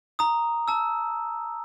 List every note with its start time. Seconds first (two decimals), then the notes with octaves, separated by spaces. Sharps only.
0.19 A#5 D#6
0.68 A5 E6